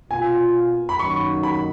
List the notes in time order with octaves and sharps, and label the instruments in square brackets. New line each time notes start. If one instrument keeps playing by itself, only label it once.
[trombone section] B2 A#3 F4 [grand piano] G#5
[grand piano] B5
[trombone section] F#2 D#3 F#3 A#3 D#4 [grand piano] C#6
[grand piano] B5